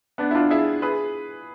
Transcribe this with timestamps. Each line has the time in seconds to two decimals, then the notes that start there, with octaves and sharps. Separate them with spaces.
0.18 B3 D4
0.31 E4
0.35 D4 F4
0.51 E4 G#4
0.82 G#4 B4